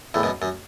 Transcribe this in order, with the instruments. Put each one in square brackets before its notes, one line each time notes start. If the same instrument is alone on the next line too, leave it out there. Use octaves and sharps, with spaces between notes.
[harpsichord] E2 A2
F#2 B2
F#2